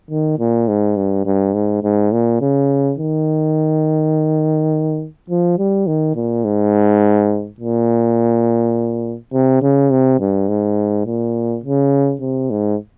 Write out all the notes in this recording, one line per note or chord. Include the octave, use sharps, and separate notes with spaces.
D#3
A#2
G#2
G2
G2
G#2
G#2
A#2
C#3
D#3
F3
G3
D#3
A#2
G#2
A#2
C3
C#3
C3
G2
G#2
A#2
C#3
C3
G#2